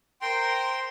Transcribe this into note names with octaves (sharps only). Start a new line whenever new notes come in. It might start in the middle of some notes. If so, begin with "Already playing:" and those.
A#4 C5 G5 C6